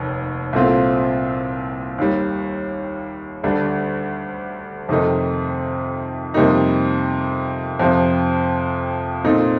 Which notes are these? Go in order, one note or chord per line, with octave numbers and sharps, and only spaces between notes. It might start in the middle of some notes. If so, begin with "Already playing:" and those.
Already playing: F1 D#2
C2 A#2 A3 C4 F4
D#2 D#3 G3
D2 D3 G3 D4
F2 C3 D#3 A3 D#4
F2 C3 G3 A#3 D#4
F2 C3 F3
A#2 A3 C4 D#4